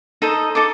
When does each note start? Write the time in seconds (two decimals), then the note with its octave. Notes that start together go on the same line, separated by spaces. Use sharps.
0.22 D#4 A4 C5 D#5
0.55 D#4 A4 D6